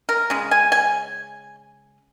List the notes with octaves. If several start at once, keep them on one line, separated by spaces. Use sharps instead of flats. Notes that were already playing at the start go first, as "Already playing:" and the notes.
A#4
C#3 G#3
G#5
G#5